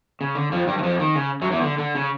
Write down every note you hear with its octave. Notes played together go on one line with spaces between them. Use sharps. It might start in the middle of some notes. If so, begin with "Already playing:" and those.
C#3
D3
F2 F3
G2 G3
E3
F2 F3
D#3
C#3
F#2 F#3
E2 E3
D3
D3
C#3